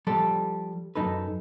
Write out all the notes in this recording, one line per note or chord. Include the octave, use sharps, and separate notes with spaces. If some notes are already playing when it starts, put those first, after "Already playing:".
F3 G3 G4 A4
F#2 D#4 A4 B4